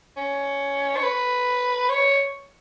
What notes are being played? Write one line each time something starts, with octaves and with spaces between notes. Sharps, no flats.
C#4
C#5
B4
C#5